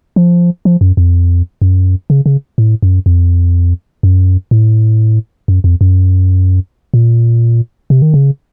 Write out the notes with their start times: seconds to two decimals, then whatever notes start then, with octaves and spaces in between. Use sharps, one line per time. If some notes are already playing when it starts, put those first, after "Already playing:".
0.16 F3
0.65 F3
0.81 F#2
0.97 F2
1.62 F#2
2.10 C#3
2.26 C#3
2.58 A2
2.83 F#2
3.06 F2
4.03 F#2
4.51 A2
5.48 F#2
5.64 F2
5.81 F#2
6.94 A#2
7.90 C3
8.02 D#3
8.14 C#3